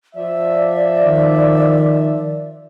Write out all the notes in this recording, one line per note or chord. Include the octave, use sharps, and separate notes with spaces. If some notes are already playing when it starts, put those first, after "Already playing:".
F3 D5 E5
D#3